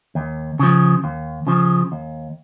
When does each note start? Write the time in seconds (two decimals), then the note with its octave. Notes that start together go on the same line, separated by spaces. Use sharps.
0.15 D#2
0.59 C#3 F3
1.04 D#2
1.47 C#3 F3
1.92 D#2